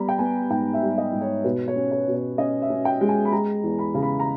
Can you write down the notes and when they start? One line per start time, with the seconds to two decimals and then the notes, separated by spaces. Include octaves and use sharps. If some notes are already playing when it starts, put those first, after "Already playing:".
Already playing: G3 B3 A#5 B5
0.09 G5
0.19 B3 G#5
0.50 G#2 G5
0.74 E5
0.83 G3
0.98 D#5
1.13 G#2
1.21 C#5
1.44 B2 B4
1.68 C#5
1.76 C#4
1.92 C#5
2.08 B2
2.15 C#5
2.38 C#4 D#5
2.62 E5
2.70 C#4
2.85 G5
3.01 G#3
3.09 G#5
3.25 B5
3.32 G#3 A#5
3.63 E2
3.79 B5
3.94 C#3
4.03 B5
4.20 A#5